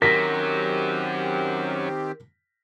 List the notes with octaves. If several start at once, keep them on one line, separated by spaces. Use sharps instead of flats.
F#2 D#3 F#3 C4 G4 A#4 A#6 B6